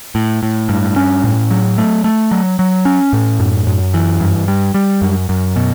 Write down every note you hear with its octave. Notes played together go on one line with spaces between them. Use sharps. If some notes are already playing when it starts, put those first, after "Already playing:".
A2
A2
G2
C#4
A2
F#3
A3
A3
F#3
F#3
C#4
A2
F#2
F#2
E3
G2
G3
G3
F#2
F#2
B2